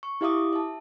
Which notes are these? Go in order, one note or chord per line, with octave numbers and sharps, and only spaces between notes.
C#6
E4 G4 E5 F5 D6 D#6
E5 A5